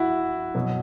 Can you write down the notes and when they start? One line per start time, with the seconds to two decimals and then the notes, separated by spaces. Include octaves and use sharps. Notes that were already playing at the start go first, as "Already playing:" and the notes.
Already playing: E4 F#4
0.55 B2 F#3